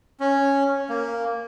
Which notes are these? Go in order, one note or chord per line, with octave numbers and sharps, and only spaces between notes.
C#4
A#3